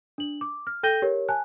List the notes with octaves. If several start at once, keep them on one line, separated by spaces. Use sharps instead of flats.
D4 F#7
D6
F6
A4 G5 G6 A#6 D#7 G7
G4 A#4 C#5
G#5 A5 F#6